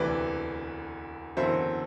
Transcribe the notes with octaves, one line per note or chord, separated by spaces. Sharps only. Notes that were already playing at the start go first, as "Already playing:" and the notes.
Already playing: E1 D2 C3 E3 B4 D5
F#1 E2 D3 F#3 C5 E5